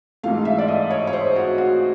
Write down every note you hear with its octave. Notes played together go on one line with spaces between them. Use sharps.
G#2 E3 A3 F5
E5
D5
D#5
C#5
C#5
C5
F#4
F#4